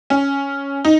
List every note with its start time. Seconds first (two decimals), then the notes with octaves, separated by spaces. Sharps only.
0.10 C#4
0.85 D#4